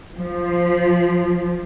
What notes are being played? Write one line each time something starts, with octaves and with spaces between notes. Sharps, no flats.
F3